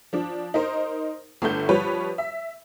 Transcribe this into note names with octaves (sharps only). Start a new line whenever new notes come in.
F3 D4
D#4 A#4 C5
G1 D3 A3 G6
F3 G3 B4 C#5
E5